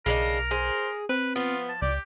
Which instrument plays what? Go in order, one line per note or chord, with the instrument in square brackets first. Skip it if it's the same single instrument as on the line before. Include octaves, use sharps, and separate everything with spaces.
[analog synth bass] B1 [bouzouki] C#3 D4 D#4 [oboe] A#4 [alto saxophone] F5
[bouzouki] G#4 [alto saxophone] C5
[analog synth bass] C4 [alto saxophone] B4
[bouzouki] F3 [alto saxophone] B3 [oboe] F4
[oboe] A5
[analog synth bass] C#2 [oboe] G4 [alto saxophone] D5